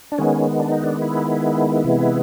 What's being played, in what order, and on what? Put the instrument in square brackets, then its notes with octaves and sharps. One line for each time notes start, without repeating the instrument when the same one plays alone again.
[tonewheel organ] D4
D#3 G#3 B3 C#4
D4
D#4
D4
E4
C3 E3 G#3 B3